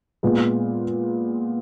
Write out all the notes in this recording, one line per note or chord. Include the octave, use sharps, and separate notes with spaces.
A#2 G#3 B3